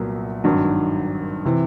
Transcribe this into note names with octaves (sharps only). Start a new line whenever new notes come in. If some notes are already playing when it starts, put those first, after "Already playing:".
Already playing: C2 A#2 F#3 B3
G#1 G2 D#3 F#3
C3 E3